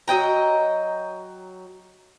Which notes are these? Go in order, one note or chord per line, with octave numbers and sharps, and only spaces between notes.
F#3 D#5 G5 A#5